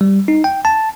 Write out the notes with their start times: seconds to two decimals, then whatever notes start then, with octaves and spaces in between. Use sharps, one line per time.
0.01 G3
0.28 D#4
0.44 G5
0.65 A5